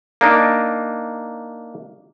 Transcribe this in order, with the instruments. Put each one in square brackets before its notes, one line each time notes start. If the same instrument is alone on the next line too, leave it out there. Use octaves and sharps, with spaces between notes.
[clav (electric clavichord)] A#3 D4 D#4